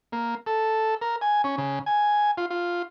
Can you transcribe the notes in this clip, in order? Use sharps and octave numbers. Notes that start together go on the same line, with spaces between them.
A#3
A4
A#4
G#5
C#4
C#3
G#5
F4
F4